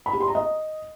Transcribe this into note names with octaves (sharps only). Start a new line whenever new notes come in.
B5
G4
C6
A#5
D#5